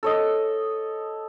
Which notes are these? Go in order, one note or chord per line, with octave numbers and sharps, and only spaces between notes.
A4 C#5 D#5